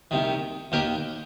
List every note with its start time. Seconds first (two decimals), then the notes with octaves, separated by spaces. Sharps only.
0.11 C2 C3 D#3
0.72 D#2 D#3 G4 A#4